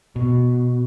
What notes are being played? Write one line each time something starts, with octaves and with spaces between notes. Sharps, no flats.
B2